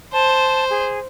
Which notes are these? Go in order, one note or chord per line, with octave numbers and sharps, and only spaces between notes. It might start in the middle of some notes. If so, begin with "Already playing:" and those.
C5 A5
G#4